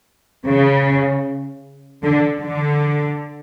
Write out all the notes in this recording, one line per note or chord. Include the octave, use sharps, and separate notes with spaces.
C#3
D3
D3